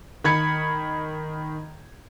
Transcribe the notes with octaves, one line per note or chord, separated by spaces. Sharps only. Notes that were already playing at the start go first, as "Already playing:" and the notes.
D#3 B5 G#6 C#7